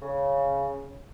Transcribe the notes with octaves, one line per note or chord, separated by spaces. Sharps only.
C#3